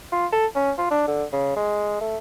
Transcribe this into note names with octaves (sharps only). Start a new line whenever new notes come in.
F4
A4
C#4
F4
D4
D3
C#3
G#3
A3